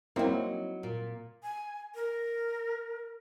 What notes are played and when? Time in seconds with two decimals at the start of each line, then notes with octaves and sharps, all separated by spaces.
0.16 F#3 A#3 C4 D#4 E4
0.83 A#2
1.43 G#5
1.95 A#4